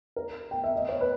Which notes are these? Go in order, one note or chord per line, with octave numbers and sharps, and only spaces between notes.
A#4
G5
E5
D#5
C#5
B4